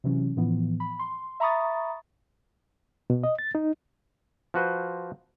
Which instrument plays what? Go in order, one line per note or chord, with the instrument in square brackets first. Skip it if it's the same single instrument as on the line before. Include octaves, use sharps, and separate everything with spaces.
[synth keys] C3 E3 F#3 C#4
A2 E3 F3 B3
B5
C6
E5 A#5 B5 C#6 D#6 A6
[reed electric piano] B2
D#5
A6
D#4
[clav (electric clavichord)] F3 F#4 B4 C5